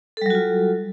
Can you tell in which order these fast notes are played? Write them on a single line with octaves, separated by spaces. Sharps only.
A4 G3 F#3 F#4 F4